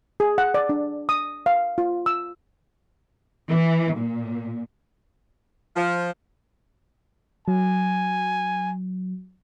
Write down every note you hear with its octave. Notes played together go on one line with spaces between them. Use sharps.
G#4
F#5
D5
D4
D#6
F5
F4
E6
E3
A#2
F3
F#3 G#5